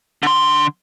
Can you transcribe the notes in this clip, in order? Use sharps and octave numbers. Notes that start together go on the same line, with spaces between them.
D3 C6